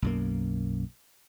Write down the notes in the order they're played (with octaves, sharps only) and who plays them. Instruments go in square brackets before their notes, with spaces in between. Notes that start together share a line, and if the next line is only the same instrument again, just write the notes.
[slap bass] B1 F#2 A#3